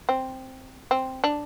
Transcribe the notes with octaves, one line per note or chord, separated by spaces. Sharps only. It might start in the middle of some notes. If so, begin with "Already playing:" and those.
C4
C4
D4